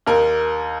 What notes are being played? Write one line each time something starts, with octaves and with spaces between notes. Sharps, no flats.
D#2 A#4